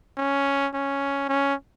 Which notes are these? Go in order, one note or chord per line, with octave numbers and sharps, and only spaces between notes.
C#4
C#4
C#4